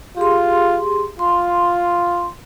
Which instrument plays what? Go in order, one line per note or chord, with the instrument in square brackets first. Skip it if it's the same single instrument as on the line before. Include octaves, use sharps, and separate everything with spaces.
[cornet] F4 [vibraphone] G4 G#4 C6
[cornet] F4 [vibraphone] C6